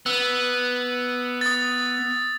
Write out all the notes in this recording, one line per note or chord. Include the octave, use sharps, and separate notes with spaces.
B3 E6
D#6 A6